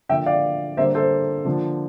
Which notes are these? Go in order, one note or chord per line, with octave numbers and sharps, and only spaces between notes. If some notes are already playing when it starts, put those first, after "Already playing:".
D3 F3 A#3 E5 G5
D5 F5
D3 G3 A#3 C5 E5
A4 C5
D3 F3 A#3